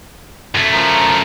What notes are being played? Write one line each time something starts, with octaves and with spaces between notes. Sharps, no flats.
F#2 A3
F3 A#4 A#5